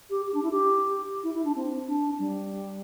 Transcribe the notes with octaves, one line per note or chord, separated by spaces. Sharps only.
G4
G4
D4
E4
G4
E4
E4
D4
C4
D4
G3